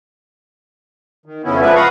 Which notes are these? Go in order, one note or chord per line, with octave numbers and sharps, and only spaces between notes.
D#3
F2 C#3 B3 C#4 E4
F3 G#3 B4 D5 E5
F5 F#5 A#5 B5 C#6 D#6